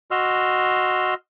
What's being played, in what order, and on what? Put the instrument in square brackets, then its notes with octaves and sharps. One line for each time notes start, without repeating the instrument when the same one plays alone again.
[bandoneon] F#4 D#5 C6 E6 F6